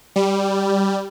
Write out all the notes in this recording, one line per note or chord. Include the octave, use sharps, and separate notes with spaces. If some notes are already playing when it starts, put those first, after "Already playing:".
G3